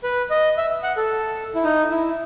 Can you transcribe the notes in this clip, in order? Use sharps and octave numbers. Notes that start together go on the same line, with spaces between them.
B4
D#5
E5
F#5
A4
E4
D#4
E4